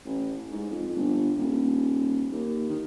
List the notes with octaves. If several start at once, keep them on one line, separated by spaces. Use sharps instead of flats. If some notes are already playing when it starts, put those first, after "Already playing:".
A1
G#2
F2
G1
D#1
D#2
D#3